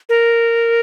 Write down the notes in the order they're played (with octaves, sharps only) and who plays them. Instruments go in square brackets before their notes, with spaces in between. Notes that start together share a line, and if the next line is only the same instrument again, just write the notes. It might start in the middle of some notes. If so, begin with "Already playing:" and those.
[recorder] A#4